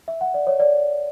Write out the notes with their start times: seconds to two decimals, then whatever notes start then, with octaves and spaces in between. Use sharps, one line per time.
0.08 E5
0.21 F#5
0.34 D5
0.47 C#5
0.60 D5